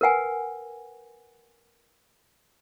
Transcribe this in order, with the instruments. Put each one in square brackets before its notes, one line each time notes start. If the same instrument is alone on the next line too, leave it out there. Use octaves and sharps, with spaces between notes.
[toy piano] A#4 B4 F#5 G#5